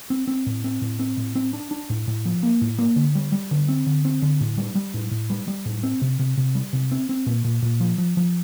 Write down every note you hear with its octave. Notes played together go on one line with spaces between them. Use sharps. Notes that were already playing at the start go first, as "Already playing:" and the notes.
C4
C4
A2
C4
A2
C4
A2
C4
D4
D4
A2
A2
F3
A#3
A2
A#3
D3
G3
G3
D3
C4
D3
C4
D3
A2
G3
G3
A2
A2
G3
G3
A2
C4
C3
C3
C3
G3
C3
C4
C4
A#2
A#2
A#2
F3
F3
F3